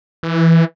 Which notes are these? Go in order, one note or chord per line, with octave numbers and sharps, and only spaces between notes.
E3